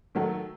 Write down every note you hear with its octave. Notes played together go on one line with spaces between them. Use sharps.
D#3 F#3 A3